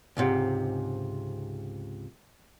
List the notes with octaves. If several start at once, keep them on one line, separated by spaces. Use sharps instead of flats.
C#2 G#2 C3